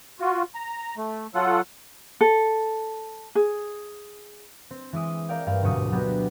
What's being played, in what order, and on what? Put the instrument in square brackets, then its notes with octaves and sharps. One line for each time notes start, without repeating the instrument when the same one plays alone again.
[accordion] F4 F#4
A#5
A3
F#3 F4 A4 F#5
[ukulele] A4
G#4
[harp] C4
E3 G#3 E4 D#6
A#4 D5 F5 G5
G2 F5
D2 G#2 B2 F#3 C#6 D#6
F#3 B3 D4 F#4 G4